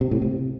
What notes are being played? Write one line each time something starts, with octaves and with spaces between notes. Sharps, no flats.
C3
A2
C3